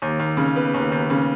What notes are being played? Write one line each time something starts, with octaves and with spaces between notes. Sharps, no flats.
D#2
D#2
C#3
B3
D#2
D#2
C#3